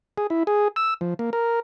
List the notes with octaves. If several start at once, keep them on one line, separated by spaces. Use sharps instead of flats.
G#4
E4
G#4
E6
F3
A#3
A#4